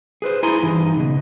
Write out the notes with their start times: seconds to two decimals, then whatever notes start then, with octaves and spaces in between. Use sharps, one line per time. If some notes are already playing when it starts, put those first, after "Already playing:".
0.22 G#4 B4 C5
0.43 E4 G#4 G#5 A#5 C6
0.62 G2 E3 D#4
0.96 C#2 B2